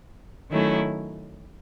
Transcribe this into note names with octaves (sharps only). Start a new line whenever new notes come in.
D#3 F#3 A3 C#4 E4